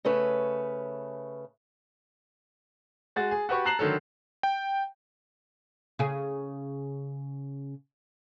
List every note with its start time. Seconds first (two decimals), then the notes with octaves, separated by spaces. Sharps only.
0.05 C#3 A3 C#4 B4
3.16 G#3 F#4 A6
3.31 G#4
3.49 F#4 G4 B4 C#6
3.65 A5 A#5 F#6 C7 E7 F#7
3.79 D3 D#3 F#3 A4
4.43 G5
5.99 C#3 G#4